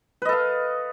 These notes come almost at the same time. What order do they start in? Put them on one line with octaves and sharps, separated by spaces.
B4 D#5 A4 F5